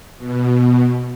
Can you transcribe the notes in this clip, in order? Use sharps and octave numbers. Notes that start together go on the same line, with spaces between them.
B2